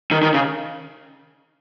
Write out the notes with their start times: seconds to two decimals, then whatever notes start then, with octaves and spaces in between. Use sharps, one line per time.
0.11 D#3
0.22 D#3
0.34 C#3